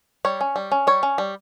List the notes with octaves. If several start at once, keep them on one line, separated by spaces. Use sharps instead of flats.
G3 C#5
C#4
G3
C#4
G3 C#5
C#4
G3